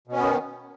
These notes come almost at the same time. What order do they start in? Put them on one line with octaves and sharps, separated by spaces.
B2 C#4 B3 D#3